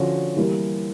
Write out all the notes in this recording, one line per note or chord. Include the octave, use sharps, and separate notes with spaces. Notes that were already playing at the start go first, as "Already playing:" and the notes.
Already playing: D3 F3 C#4 F#4
E3 G3 A#3